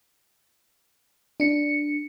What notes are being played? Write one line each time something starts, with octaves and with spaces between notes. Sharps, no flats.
D4 C#7